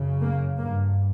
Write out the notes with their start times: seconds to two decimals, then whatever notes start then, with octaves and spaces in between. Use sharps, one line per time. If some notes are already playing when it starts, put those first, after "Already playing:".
Already playing: F#2 C#3
0.22 A#3
0.57 G2 A#3